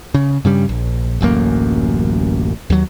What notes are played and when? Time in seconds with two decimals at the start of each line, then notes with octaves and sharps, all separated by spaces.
0.14 C#3
0.45 G2 C#3 G3
0.69 A#1
1.21 D1 A1 F#2 A#3
2.70 D#2 F#3